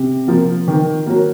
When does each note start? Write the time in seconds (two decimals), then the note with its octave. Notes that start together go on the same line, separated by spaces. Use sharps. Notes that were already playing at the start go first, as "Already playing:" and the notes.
Already playing: C3
0.28 F3 A#3
0.68 D#3
1.06 F#3 A#3